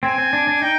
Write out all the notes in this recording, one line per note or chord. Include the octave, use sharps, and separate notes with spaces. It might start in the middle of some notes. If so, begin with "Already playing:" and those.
C4 G#5
C4
D4
D4
D#4 G5